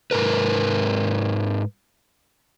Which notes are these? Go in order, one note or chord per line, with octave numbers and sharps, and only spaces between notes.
G#2 A#4 B4